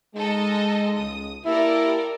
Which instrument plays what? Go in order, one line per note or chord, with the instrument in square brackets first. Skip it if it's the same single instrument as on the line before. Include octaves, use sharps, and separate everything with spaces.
[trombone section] G#3 [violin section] D#4 A4 D#5
[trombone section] C#2 [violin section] D#6
[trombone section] A#3 G4 [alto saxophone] E4 [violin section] A4 A#4 D5